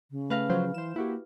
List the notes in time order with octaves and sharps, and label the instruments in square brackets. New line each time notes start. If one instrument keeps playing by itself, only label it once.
[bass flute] C#3
[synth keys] A3 [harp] B4 F5 A#6
[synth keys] F3 F#3 C5
[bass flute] E3 [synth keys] C5 E7
[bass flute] A#3 [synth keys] E4 F#4 G4